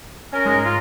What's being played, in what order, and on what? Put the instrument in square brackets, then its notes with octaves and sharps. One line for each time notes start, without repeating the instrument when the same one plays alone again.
[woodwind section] C#4 A#4
[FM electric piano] G#2 [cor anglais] G#3
[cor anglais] F4